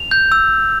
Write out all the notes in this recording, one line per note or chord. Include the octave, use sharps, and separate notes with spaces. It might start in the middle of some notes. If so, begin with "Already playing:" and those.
Already playing: F7
G6
E6